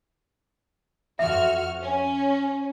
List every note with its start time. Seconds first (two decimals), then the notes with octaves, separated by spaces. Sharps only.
1.19 F2 F#4 E5 F6
1.82 C#4